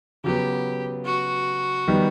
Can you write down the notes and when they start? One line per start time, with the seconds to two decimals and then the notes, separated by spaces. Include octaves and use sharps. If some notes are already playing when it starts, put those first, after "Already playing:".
0.24 C#3 F#3 B3 G4
1.05 F#4
1.88 D#3 G3 B3